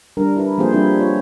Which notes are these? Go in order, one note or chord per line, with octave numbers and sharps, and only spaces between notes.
G3 D4 A#4
E4 B4
F3 A#3 C4 G4 G#4 C5
G3 C4 D4 E4 G#4
C4 F4 C#5